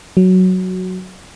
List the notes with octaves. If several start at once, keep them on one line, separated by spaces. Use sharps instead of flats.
F#3